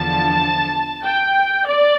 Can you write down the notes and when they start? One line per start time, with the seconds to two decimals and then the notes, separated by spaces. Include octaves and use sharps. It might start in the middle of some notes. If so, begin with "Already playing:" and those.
Already playing: E2 D3 F3 A5
1.03 G5
1.67 D5